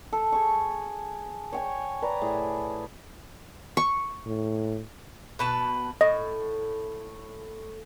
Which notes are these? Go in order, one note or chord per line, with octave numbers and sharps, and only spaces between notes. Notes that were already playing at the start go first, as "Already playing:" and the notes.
A4
G#4 C#6
C#5 G5 G#5
B4 D5 A#5
A2 G#4
C#6
A2
B2 B4 A5
A2 D#5